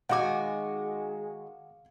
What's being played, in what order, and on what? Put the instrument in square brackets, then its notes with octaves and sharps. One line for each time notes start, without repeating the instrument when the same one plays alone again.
[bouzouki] D#3 F#4 G#5 [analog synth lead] G#3 [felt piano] F5 D6 [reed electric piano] F#5